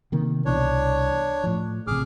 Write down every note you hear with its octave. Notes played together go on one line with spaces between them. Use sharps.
C3 D#3 A#3
C2 B2 E3 D4 C#5
A2 F3
A1 C3 G#4 D6 F6